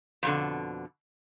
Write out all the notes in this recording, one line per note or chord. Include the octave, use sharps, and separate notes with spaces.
F2 B2 D3